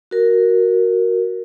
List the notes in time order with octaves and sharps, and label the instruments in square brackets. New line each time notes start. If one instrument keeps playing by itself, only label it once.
[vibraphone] F#4 A#4